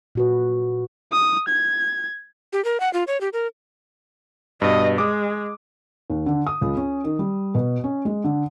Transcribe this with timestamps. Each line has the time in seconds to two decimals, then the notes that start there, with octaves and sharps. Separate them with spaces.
0.15 A#2 F#4 B4
1.12 D#6
1.49 G#6
2.53 G4
2.65 A#4
2.80 F#5
2.93 F4
3.07 C#5
3.21 G4
3.33 A#4
4.62 G2 B2 D#5
4.98 G#3 D6 D#6
6.10 D#2
6.26 D3
6.47 D#6
6.61 C#2
6.77 C#4
7.04 D#3
7.19 G3
7.55 B2
7.84 C#4
8.05 G#3
8.24 D3